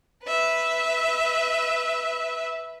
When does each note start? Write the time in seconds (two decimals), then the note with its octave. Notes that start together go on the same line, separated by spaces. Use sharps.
0.23 B4 E5